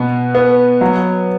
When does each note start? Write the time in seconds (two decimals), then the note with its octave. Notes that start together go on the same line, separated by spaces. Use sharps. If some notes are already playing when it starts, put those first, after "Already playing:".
Already playing: B2 B3
0.35 B3
0.81 F#3